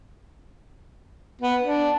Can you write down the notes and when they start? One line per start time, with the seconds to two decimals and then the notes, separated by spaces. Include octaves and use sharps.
1.42 B3
1.61 D4